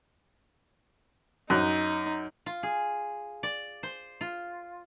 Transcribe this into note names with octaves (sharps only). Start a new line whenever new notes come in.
F#2 D#4 F#6
F4
G#4
D5
C5
F4